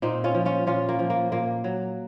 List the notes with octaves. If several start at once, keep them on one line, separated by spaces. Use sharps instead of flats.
A#2 C4 D#4
C#4 F4
F3
C#4 F4
A#2 C#4 F4
A#3
F3
A#3
A#2 A#3
F#3